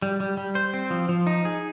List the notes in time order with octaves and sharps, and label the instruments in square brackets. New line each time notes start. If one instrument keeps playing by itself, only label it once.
[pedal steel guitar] G3
G3
G3
C5
C4
F3
F3
D#4
G#4